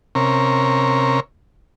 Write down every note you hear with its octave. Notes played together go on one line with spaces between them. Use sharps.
C3 C#4 A#4